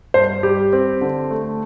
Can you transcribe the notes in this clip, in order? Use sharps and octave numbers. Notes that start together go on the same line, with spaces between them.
G2 C5
G3 G4
C4
D3
A3